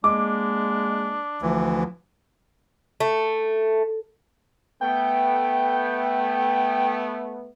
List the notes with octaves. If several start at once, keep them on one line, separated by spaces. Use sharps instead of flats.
G#3 A#3 D4 D6
D2 E3 F3
A3
A3 B3 G5